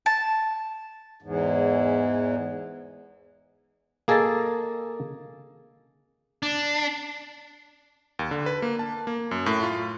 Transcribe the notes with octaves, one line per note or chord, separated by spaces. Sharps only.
A5
E2 G#2
A#3 G#4 A4 D#5 A5
D4
D#2
D3
B4
A#3
A5
A#3
F#2
A2
F4